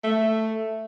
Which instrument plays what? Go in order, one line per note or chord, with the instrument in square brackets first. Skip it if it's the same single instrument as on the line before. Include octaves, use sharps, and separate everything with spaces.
[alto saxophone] A3